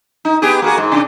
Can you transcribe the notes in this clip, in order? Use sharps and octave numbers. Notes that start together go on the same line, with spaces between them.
D#4
B3 G4 G#4
A#3 F#4 G#4
G#2
C3 D4